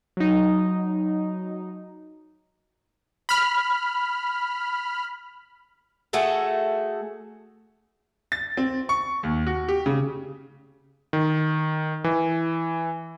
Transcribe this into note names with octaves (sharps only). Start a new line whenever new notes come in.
F#3 D#4
B5 F6
A3 F#4 G#4 A4
A6
C4
C#6
D#2
F#4
G4
C#3
D#3
E3